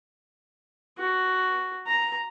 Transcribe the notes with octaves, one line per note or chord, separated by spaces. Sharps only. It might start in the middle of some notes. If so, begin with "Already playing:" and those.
F#4
A#5